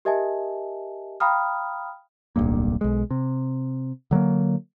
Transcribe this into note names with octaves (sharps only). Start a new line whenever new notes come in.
G4 A#4 D#5 E5 G#5 A5
F5 G5 A#5 B5 D#6 F6
D1 B1 G2 A#3
B1 G#3
C3
D3 F#3 G#3 A#3